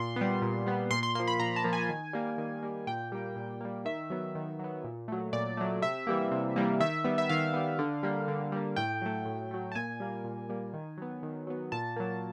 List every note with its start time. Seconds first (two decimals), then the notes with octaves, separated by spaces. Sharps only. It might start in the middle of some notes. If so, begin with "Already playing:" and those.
Already playing: A#2 C6
0.16 G3 B3
0.42 A#2
0.66 G3 B3
0.90 A#2 C6
1.03 C6
1.15 A#3 C6
1.19 F3
1.28 B5
1.39 A#2 A#5
1.56 A5
1.64 F3 A#3
1.73 G#5
1.89 D#3
2.13 G3 A#3
2.38 D#3
2.63 G3 A#3
2.87 A#2 G5
3.12 G3 A#3
3.36 A#2
3.61 G3 A#3
3.85 D#3 E5
4.10 F#3 B3
4.35 D#3
4.59 F#3 B3
4.84 A#2
5.08 F#3 A3
5.33 A#2 D5
5.57 F#3 A3
5.82 C3 E5
6.07 E3 G3 A#3
6.32 C3
6.56 E3 G3 A#3
6.80 D#3 E5
7.04 G3 B3
7.18 E5
7.29 D#3 F5
7.54 G3 B3
7.79 D3
8.03 G3 A#3
8.28 D3
8.52 G3 A#3
8.76 A2 G5
9.02 F#3 A3
9.26 A2
9.51 F#3 A3
9.72 A5
9.75 A#2 G#5
10.00 G3 A#3
10.24 A#2
10.49 G3 A#3
10.74 D#3
10.98 F#3 B3
11.23 D#3
11.47 F#3 B3
11.72 A#2 A5
11.96 F#3 A#3